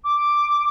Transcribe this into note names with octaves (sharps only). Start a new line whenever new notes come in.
D6